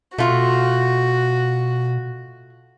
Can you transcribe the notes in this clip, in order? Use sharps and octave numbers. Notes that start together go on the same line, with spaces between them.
B2 A3 F4 F#4